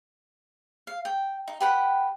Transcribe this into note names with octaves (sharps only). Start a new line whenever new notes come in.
F5
G5
D#4
G4 B4 F#5 G5